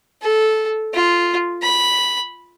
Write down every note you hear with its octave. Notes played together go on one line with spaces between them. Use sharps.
A4
F4
B5